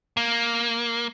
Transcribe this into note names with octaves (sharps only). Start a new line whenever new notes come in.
A#3